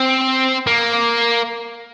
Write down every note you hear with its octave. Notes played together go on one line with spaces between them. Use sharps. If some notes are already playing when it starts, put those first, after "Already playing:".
Already playing: C4
A#3